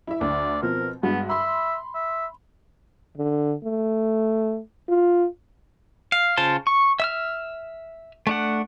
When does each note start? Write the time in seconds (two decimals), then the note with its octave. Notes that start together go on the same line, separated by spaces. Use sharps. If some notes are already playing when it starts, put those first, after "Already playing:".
0.07 E4 E5
0.21 D2 D5
0.62 B2 F3 C4 A#4
1.03 G2 G#3 B3 F#4
1.30 E5 B5 C6
1.95 E5
3.18 D3
3.64 A3
4.89 F4
6.12 F5
6.37 C#3 F4 C5 A5 C6
6.67 C#6
7.00 E5 E6 F6
8.27 A3 D4 F#5